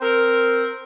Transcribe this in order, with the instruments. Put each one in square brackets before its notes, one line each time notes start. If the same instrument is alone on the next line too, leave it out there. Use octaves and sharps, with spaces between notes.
[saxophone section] C4 A#4